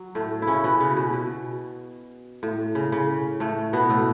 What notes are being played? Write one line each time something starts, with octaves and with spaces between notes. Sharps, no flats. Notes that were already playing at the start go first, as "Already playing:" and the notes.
Already playing: F#3
A2 A3
E4
C#3 C#4
B2 B3
C#3 C#4
B2
B2
A2
C#3
C#3
A2 A3
B2 B3
A2 A3